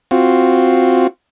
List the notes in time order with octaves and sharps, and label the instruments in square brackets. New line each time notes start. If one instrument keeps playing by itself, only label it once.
[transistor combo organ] C4 F4 F#4